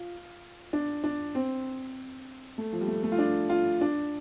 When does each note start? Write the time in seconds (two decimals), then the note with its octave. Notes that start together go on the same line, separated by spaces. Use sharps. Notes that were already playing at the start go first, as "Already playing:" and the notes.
Already playing: F4
0.73 D4
1.04 D4
1.35 C4
2.58 A3
2.73 F3
2.81 G3
2.88 A3
3.03 A3
3.12 F4
3.19 D4
3.49 F4
3.81 D4